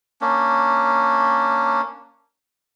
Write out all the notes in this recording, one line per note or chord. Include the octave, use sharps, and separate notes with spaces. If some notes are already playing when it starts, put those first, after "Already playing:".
A#3 C#4 D4